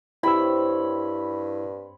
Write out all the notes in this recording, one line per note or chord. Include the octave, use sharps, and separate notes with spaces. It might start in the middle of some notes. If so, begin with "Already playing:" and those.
G2 C4 E4 G4 C#5 B5 E6